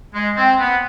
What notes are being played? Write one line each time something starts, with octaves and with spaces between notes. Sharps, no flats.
G#3
C4
B3